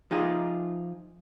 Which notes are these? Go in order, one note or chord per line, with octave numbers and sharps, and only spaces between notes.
F3 D#4 F4 G#4